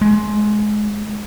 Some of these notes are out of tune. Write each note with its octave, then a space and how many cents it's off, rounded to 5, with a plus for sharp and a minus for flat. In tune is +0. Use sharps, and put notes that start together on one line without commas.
G#3 +20